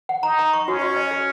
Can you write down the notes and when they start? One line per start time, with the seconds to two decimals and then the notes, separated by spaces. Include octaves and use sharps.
0.09 F#5
0.23 D#4 A#5
0.39 A#5
0.53 C#6
0.67 C#4 F#4
0.81 D#5
0.96 D#5
1.11 G#4